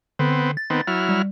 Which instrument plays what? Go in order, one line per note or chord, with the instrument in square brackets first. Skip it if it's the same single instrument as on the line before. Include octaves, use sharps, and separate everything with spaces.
[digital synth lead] D3 [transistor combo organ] B3 C4
[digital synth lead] A6
[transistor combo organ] D#3 B3 C4
F#3 E4 F6
[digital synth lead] G3